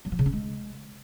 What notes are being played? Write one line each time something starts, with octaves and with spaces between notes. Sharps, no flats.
F#3
F3
C#3
C#4
G#3